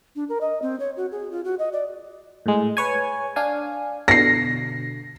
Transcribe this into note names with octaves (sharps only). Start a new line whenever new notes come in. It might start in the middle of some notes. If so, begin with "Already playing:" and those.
D4
A#4
D#5
C4
C#5
F#4
G#4
F4
F#4
D#5
D5
A2 G#3
B4 C#5 G#5
D4 F5 G#5
B2 D3 A#6 C7